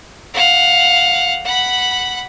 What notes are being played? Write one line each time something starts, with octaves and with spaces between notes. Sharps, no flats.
F5 F#5
F#5 B5